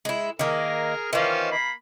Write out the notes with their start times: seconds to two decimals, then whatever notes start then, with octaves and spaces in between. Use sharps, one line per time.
0.05 G#3 E4
0.39 D#3 A#3 G#4 A#4
1.13 D#3 E3 C#4 F4 C5
1.51 A#3 B5